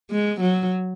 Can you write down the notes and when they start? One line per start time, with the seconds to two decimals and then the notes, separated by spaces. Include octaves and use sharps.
0.11 G#3
0.41 F#3